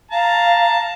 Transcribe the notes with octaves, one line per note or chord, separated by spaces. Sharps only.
F5 A5 A#5